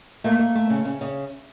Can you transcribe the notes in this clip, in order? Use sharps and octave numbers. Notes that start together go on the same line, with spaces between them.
A3 A#3
A3
A3
C#3
C#3
C#3